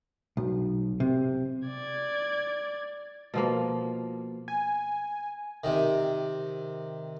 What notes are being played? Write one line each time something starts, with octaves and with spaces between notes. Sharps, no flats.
B1
C3
D5 G#6
B2 F3 A#3
G#5
C3 D#3